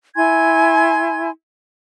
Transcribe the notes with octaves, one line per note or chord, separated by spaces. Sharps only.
E4 G#5 C6 G#6